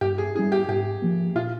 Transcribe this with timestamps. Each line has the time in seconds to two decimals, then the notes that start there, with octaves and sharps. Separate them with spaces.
0.01 G2 G4
0.18 G#4
0.35 G3 C#4 E4 G#4
0.52 G4
0.68 G#2 G4
1.02 F3 A#3
1.35 A#2 F4